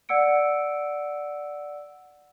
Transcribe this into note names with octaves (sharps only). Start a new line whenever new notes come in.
D5 F#5 E6 C#7 D7